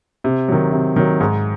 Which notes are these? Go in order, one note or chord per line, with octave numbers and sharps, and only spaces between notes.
C3
D#3 F#3
C3
D#3 F#3
G#2